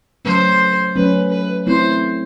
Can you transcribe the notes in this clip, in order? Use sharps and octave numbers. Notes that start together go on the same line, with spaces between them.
F#3 A3 C#4 C5
F#3 A3 C#4 B4
B4
A3 C4 E4 C5